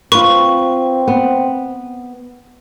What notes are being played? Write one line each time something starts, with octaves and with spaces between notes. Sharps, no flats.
C4 F4 B4 C#6
B3